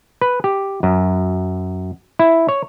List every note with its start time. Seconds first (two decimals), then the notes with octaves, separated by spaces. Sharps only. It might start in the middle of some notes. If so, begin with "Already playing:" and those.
0.21 B4
0.44 G4
0.83 F#2
2.19 E4
2.49 C#5